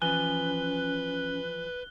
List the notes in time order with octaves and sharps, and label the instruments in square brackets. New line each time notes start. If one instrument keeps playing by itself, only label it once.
[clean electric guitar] E3 F3 G#5 [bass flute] C#4 [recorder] B4 [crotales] F#6 G7